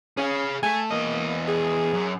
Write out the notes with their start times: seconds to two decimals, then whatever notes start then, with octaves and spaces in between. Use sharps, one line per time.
0.17 C#4 G#4 F5
0.63 A3 G#5
0.91 E2 A#3 D#5
1.48 G#4
1.93 F#2